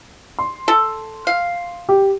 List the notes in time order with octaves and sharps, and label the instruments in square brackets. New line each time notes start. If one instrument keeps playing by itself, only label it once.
[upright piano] C6
[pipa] A4
F5
[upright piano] G4